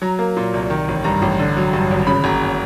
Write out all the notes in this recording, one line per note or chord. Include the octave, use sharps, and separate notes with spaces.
F#3 A#5
A#3
A#2
C2
D#3
A1
G2 A#5
A1
D3
F#3
G2
G#1
C#3 B5
F#1 A#5